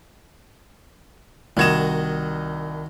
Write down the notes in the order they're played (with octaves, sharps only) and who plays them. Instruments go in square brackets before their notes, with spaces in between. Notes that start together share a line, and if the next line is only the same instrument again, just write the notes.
[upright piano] C2 G#6 E7 [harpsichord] D#3 F#4 D#5